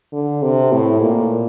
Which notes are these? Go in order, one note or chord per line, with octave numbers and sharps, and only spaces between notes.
D3
C3
A2
A#2